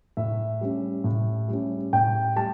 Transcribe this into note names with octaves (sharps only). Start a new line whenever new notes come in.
A2 E5
G3 C#4
A2
G3 C#4
A2 G5
G3 A5